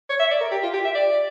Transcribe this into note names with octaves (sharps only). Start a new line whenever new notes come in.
C#5
E5
D5
A#4
G4
F4
G4
E5
D5